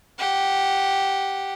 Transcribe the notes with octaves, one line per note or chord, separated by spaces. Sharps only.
G4 F#5